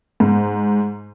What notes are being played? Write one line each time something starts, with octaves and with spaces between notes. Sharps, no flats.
G#2